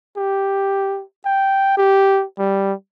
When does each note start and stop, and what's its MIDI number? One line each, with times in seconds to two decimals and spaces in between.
0.17 1.03 67
1.25 1.73 79
1.77 2.24 67
2.38 2.73 55